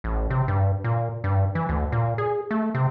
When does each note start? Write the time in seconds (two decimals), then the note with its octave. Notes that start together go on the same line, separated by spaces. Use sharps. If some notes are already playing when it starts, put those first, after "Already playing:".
0.04 A1
0.30 C3
0.48 G2
0.84 A#2
1.24 G2
1.55 E3
1.69 D2
1.92 A#2
2.18 G#4
2.51 A3
2.75 C3